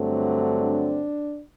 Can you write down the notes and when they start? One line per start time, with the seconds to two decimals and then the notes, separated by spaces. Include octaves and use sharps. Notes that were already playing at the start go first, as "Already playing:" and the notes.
Already playing: G2 D3 F#3 A3 C4
0.59 D4